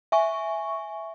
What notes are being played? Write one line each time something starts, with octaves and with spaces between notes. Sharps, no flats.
E5 G#5 C#6